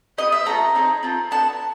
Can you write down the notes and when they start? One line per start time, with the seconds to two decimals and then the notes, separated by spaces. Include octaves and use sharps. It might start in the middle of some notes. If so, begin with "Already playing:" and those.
0.18 B3 E4 G4 D#5
0.32 E5
0.46 A3 C#4 F4 A4 A#5
0.75 C4 D#4 G#4
1.03 C4 F4 A4
1.31 B3 D4 F#4 A4 A5